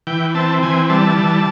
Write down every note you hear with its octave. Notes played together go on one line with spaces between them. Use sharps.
E3 G5
C4 A5
E3 G#5
G3 A5
E3